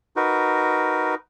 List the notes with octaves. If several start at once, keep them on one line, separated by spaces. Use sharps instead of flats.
D#4 F#4 A#4 B4